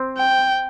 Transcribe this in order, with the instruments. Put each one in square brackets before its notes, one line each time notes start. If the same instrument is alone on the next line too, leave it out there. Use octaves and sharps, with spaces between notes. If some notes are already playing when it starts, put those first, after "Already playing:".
Already playing: [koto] C4
[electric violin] G5